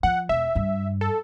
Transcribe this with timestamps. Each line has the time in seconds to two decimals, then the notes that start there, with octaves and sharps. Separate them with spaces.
0.03 F3 F#5
0.29 E1 E5
0.55 G2
1.01 A4